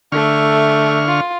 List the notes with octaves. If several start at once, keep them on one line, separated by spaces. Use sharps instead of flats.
D3 A3 E5 C#6 F6
F4